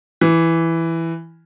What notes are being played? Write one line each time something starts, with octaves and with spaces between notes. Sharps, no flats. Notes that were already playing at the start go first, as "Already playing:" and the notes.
E3